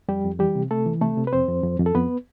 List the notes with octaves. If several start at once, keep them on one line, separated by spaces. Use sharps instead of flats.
F2 G3 G4
F2
E3 G3 G4
C3
C3 A3 A4
E3
C3 A3 A4
C3
B4
F2 C4 C5
F2
F2
F2
A4
F2 B3 B4